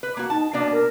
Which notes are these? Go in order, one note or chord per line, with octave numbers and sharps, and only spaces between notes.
B4
A#3 F#4
D#4 A5
B2 A#3 D4 D5
A#4